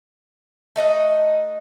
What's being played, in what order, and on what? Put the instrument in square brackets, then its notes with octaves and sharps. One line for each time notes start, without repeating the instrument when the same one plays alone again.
[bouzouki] A3 D#4 D#5 F#5